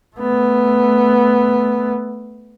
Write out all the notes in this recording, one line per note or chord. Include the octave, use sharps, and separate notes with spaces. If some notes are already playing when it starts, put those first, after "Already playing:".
A3 B3